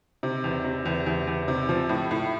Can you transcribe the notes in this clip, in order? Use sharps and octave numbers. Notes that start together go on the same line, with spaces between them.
C3
E2
C3
E2
E2
E2
C3
F3
A2
A2